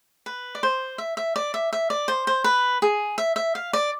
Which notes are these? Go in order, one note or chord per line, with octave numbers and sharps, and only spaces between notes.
B4
D5
C5
E5
E5
D5
E5
E5
D5
C5
C5
B4
G#4
E5
E5
F5
D5